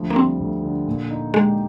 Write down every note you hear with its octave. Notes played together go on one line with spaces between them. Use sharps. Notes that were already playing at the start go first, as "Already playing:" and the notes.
Already playing: D2 F3
A#3
G3 C4
D2
D3
A#2
D#4
G#3 G4